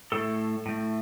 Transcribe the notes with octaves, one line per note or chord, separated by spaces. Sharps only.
A2 A3 A4
A2 A3